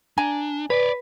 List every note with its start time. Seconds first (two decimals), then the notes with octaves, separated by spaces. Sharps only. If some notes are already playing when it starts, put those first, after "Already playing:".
0.18 D4 G#5 A#5
0.70 B4 C#5 D5